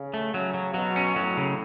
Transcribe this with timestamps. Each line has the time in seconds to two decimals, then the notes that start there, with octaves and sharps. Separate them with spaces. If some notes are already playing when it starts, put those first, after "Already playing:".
Already playing: C#3
0.14 A3
0.33 C#3 F#3
0.54 F#3
0.74 B2 F#3
0.96 C#4
1.16 A2 F#3
1.37 C#3